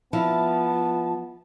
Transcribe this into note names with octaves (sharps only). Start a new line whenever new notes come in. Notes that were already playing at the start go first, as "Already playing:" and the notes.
F3 B3 E4 A5